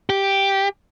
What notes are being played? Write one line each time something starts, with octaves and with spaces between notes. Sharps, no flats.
G4